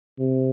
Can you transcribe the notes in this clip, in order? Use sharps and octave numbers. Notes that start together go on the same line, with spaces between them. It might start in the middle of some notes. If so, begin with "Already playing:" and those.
C3